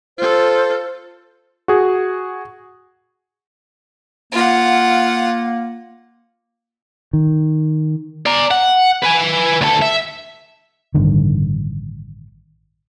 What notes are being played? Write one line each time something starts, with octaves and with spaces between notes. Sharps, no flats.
F4 A4 C5
F#4 G#4
A#3 F4 F#5
D#3
D5 A#5
F#5
B4 G#5
D2 A4
E5
A1 G2 D3 D#3